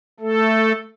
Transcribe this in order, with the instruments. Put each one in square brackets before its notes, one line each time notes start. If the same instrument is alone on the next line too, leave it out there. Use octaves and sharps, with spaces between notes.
[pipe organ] A3 A4